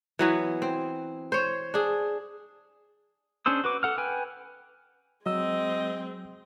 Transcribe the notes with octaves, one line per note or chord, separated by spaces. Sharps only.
E3 F#3 B3
C4
C5 C#5
D4 G#4
C#4 D4 G#4 C5 E6
F#4 B4 D6
A4 F#5 F6
B4 G5 G#5
F#3 G#3 C4 D#5 E6